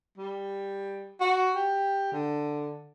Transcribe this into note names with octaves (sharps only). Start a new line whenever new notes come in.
G3
F#4
G4
D3